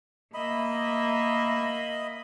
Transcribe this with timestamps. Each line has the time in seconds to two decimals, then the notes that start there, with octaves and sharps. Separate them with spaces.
0.34 A#3 D#5 E5 B5